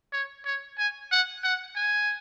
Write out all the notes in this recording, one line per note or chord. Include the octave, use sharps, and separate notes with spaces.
C#5
C#5
G#5
F#5
F#5
G#5